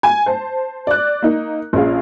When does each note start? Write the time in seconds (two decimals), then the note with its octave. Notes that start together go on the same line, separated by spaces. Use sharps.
0.03 G#5
0.26 C5 A5
0.87 D5 F#6
1.22 A#3 D#4
1.73 A#1 C#4 G#4 F5